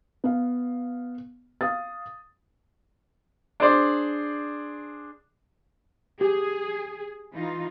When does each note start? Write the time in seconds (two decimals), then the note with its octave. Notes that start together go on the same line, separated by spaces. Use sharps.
0.24 B3 F5
1.61 F5 D#6 A6
3.60 D4 G#4 C5 D5
6.21 G4 G#4
7.32 E3 D#4 F4